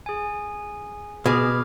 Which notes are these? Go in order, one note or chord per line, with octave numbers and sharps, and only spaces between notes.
G#4 G#5
B2 G#4 D6 F6 G#6